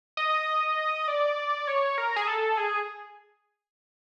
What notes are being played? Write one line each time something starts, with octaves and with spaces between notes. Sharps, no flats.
D#5
D5
C#5
A#4
G#4
A4
G#4